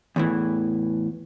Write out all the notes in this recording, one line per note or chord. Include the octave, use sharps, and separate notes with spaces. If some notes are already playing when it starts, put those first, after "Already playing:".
E2 A2 E3